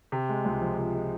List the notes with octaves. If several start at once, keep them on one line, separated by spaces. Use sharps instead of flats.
C3
G#3
C#2
F3
C3
G#3